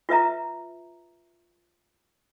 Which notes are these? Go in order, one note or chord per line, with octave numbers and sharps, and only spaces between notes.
F4 B4 E5 A#5